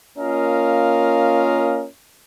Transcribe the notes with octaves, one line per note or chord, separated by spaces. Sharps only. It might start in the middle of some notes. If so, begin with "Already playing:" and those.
A#3 C#4 F4 A#4 D#5 F5